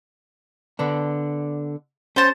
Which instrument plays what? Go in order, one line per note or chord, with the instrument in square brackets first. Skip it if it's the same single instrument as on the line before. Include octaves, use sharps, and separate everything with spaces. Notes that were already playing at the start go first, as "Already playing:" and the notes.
[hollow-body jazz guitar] D3 B3 D4
[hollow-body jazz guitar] C#4 [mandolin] C5 A5